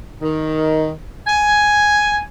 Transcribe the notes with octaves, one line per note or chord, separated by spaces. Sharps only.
D#3
G#5